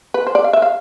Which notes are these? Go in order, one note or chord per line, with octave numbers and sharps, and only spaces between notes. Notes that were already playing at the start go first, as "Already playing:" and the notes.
B4
C5
D5
F5
E5
F5